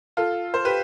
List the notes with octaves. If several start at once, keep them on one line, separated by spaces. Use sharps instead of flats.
F4 A4
C5
G4 B4